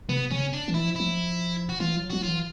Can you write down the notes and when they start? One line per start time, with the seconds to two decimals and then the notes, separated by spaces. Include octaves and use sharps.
0.09 C3 B3
0.31 C#3 C#4
0.53 D4
0.68 E3
0.74 E4
0.84 F3
0.95 F3 E4
1.69 F#4
1.80 E3 F4
1.97 F#3
2.10 F#3 F#4
2.23 E3 F4